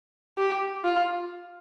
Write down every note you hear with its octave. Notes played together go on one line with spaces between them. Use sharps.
G4
F4